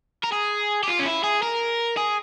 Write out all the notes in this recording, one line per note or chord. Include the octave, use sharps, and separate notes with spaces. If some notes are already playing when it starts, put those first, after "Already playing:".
A#4
G#4
G4
F4
C#4
E4
G#4
A#4
G#4